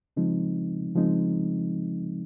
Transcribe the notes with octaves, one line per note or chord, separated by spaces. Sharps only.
C#3 F3 G#3 C4 D#4
C#3 F3 G#3 C4 D#4